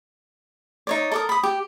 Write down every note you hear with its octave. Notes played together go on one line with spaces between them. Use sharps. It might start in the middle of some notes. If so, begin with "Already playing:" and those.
D#4 C#5 D5
A4 A#4 D#6
B5 D#6
G4